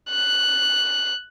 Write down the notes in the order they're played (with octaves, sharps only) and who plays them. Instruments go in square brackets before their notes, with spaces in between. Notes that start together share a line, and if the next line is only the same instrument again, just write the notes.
[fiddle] F#6